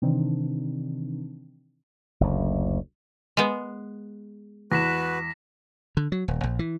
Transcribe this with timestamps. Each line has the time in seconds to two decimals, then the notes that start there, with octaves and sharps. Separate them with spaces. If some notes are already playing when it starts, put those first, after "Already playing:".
0.02 C3 D#3 E3 C4 D4 D#4
2.21 F#1 D2
3.37 G#3 B3
4.72 E2 F#4 B4 A#6 B6 E7
5.97 D3
6.12 F#3
6.28 D#1
6.44 A#1
6.59 E3